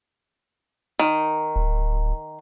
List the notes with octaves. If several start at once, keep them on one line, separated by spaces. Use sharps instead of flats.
D#3
D1